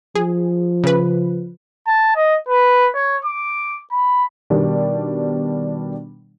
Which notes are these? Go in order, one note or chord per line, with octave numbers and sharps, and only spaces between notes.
F3 G#4
C#3 B4
A5
D#5
B4
C#5
D6
B5
B2 D#3 G3 B3 D4